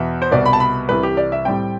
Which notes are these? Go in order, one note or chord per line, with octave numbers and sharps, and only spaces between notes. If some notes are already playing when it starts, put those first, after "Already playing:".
Already playing: E2 B2 B3 E5
C5
C2 B2 B3 D5
B5
A5
B5
C2 C3 E3 G3 B4
G4
D5
E5
A2 G3 C4 G5